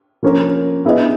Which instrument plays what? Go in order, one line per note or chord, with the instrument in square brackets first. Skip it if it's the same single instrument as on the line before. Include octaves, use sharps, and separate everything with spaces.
[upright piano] F3 A#3 C#4 F4 A#4
B3 E4 G#4 B4 D#5